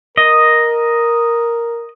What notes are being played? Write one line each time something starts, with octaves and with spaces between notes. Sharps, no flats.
A#4 D#5